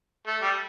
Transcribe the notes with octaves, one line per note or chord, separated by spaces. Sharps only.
A3
G3